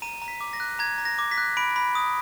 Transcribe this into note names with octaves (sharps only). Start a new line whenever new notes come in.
A#5 D#7
A#5
B6
D6
A#6
F#6
A#5 G#6
A#5
A#6
D6
B6
F#6
B5 D7
B5
D#6